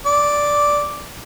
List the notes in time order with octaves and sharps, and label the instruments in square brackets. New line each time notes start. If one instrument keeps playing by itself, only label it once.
[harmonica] D5